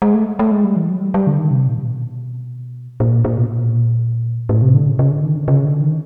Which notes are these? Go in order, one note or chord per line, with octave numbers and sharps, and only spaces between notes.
G#3
A3
A3
G#3
G3
E3
F#3
G3
G3
D3
D#3
C3
A#2
C3
B2
A#2
A#2
B2
A#2
A2
C3
D3
C#3
C#3
D3
D#3
D3
C#3
D3
D#3